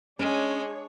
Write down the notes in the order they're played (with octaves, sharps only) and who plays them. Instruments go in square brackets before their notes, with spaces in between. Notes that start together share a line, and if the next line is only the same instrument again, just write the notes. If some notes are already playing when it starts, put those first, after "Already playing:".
[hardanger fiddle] G#3 [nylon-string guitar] C#4 [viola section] D4 G#4 C#5